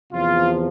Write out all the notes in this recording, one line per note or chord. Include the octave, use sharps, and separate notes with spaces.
E2 C3 F3 F4